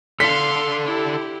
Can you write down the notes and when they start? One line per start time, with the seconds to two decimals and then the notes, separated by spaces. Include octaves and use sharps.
0.20 D4 A4 F5 C6 B6
0.85 E4 G4